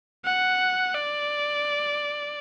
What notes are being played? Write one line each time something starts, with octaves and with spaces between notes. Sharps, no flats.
F#5
D5